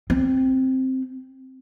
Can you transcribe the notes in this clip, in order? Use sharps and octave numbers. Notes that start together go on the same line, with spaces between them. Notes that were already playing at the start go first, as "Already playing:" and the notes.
C4